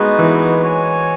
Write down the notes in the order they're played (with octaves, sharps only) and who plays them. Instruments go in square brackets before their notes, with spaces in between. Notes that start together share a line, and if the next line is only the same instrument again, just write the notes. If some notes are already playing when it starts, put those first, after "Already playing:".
Already playing: [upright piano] G#3 [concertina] B3 D#4 F#4 B4
[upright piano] E3
[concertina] F#4 C#5 G#5